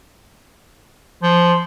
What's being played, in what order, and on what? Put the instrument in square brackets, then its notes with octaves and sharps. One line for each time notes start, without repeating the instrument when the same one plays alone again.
[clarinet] F3 [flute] C6